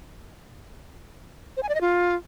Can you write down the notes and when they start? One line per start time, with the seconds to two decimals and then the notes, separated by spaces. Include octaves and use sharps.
1.57 C5
1.63 G#5
1.69 D5
1.75 D#5
1.81 F4